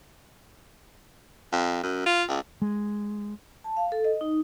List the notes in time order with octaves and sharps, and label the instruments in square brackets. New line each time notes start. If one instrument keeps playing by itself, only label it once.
[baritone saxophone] F2
F#2
F4
C#2
[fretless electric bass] G#3
[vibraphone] A5
F5
A4
D#5
D#4